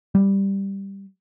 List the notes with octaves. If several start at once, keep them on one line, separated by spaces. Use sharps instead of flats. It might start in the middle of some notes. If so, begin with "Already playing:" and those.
G3